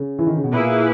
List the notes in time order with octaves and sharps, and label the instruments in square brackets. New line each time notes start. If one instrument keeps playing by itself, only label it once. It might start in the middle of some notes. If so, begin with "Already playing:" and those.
Already playing: [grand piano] C#3
E3
D#3
C#3
B2
[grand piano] A#2 [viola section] A#3 E4 G#4 B4